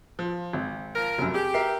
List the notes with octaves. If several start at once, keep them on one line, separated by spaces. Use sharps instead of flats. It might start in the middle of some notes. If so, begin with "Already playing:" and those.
F3
G#1
F3 A#4
F1 F#2
G4 G#4
A#4 E5 C7